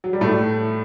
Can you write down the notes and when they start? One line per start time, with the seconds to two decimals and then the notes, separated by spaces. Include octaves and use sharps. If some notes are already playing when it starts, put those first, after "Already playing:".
0.04 F#3
0.13 G3
0.21 A2 A3